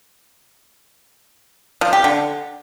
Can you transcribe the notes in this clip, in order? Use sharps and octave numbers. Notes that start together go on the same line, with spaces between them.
F3
G4
D3